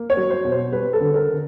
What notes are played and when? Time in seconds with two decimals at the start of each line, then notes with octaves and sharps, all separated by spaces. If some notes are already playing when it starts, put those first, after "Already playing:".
Already playing: A#3
0.10 C#5
0.17 F#3
0.30 C5
0.44 B2
0.52 C5
0.72 G3 B4
0.93 A4
1.00 D3
1.14 A#4
1.28 D3